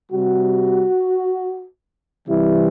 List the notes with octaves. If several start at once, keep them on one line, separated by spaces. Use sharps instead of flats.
C3 G3 F#4
C3 E3 G3 E4